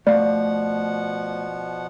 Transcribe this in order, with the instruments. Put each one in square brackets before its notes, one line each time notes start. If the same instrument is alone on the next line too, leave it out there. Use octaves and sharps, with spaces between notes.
[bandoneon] B2 F3 F#5 [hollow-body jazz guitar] A3 F5 [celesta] D5